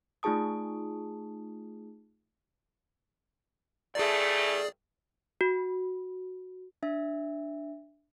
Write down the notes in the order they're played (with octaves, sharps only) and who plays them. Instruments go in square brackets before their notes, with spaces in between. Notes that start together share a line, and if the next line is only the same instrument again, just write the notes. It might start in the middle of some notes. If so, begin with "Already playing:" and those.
[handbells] A3 D#4 F4 G#4 A5 D#6
[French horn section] G2 E3 A3 [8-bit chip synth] G#4 D5
[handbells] F#4
[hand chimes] D4 E5